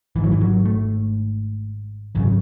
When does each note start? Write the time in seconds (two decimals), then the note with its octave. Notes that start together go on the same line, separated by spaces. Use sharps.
0.16 G#1 G#2 E3
0.24 F#3
0.32 E3
0.41 F#3
0.65 A3
2.15 G#1 F#2 C#3